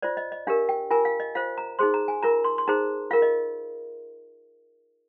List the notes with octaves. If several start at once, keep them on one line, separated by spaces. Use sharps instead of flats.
F4 C5 D5
D#5
D#5
D4 G4 A#4 F5
G5
F4 A#4 G#5
F5
D#5
F4 C5 F5
A#5
D#4 G#4 C5 C6
A#5
G#5
F4 A#4 A#5
C6
C6
D#4 G#4 C5 A#5
F4 A#4 F5
D#5